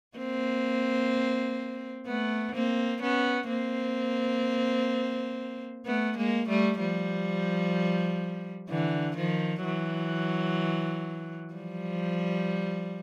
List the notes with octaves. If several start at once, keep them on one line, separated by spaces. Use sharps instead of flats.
A#3 C4
A3 B3
A#3 C4
B3 C#4
A#3 C4
A3 B3
G#3 A#3
G3 A3
F3 G3
D3 E3
D#3 F3
E3 F#3
F3 G3